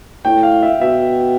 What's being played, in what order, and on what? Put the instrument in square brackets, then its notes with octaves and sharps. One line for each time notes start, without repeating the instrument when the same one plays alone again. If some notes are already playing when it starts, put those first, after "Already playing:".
[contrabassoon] A2 [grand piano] G5
[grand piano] F5
E5
[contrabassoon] B2 [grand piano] E5